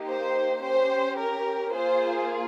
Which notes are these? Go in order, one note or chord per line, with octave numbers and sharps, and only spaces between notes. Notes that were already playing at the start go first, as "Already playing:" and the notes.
Already playing: A#3 D#4 G4
C5
C#4 G4 C5
A#4
A#3 F4 G#4 C5